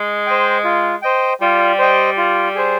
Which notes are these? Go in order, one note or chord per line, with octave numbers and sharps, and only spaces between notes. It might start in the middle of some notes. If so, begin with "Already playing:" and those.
Already playing: G#3
C5 D#5 G5
F4
C5 D#5 G5
G3 F4
C5 D#5 G5
F4
G#4 C5